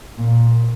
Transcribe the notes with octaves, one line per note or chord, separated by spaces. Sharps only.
A#2